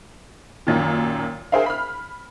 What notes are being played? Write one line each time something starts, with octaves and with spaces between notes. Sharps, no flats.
F#2 A#2 D#3
G#4 A#4 C5 E5 F5
B5 F6